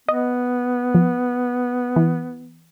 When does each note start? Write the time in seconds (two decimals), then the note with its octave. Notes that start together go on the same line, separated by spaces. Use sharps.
0.09 B3 D#5
0.95 F3
1.96 E3